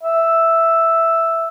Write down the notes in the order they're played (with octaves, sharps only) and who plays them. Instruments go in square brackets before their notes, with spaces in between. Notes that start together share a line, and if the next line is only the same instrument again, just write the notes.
[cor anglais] E5